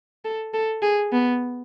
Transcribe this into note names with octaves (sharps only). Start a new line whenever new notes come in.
A4
A4
G#4
B3